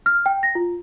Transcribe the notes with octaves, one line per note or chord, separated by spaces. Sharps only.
F6
G5
A#6
F4